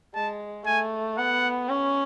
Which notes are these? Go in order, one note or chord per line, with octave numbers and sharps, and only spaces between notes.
G#3 A5
A3 G#5
B3 F#5
C#4